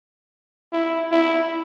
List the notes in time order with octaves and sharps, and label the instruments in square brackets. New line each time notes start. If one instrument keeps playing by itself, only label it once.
[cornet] E4
E4